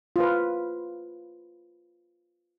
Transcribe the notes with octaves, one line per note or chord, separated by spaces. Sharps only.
F4 B4